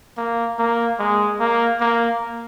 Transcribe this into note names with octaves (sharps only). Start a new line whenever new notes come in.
A#3
A#3
G#3
A#3
A#3